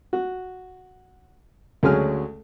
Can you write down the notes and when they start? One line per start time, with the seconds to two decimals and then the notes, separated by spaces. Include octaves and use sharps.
0.13 F#4
1.83 D2 C#3 F#3 G#3 G#5 F6